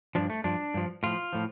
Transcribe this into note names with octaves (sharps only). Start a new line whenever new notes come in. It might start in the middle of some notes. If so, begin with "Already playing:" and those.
G2 F3 D4
A3
G2 F3 D4
G2 F3
A2 F3 F4
A2 F3